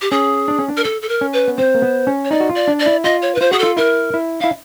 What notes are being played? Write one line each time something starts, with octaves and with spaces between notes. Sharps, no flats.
G4
C#4 G#4
D4
C#4
D4
A#4
A4
A4
A#4
C#4
B4
B3
C4 C5
A#3
B3
C#4
C#5
D#4 D5
F#4
F4
D5
D4
D5
E4
F4 D#5
C#5
B4
F4 C5
F#4 G#4
F4 A4
E4 A#4
E4
E4 F5